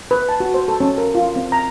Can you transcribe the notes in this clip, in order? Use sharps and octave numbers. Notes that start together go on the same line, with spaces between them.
B4
A5
F#4
C5
A4
C#4
A#4
F4
C4
A#5